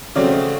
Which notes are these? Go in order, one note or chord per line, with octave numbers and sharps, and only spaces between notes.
C#3 F#3 A3 C4 D5